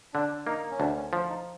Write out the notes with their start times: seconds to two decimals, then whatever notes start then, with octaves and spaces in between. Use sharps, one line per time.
0.14 D3 D4
0.46 A#3 D#4
0.71 C#4
0.79 D2 D4
0.96 C#4
1.13 F3
1.29 D#4